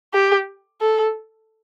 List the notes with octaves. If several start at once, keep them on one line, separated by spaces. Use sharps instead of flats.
G4
A4